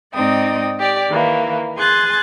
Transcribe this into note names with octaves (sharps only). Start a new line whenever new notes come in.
G#2 C4 D#4 D5 G5 D#6
G4 D5
D#3 E3 A#3
G#4 G#5 C6 F#6 A6